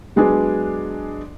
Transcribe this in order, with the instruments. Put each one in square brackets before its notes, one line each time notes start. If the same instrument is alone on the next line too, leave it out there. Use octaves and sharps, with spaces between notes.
[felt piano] F#3 G#3 B3 D4 G#4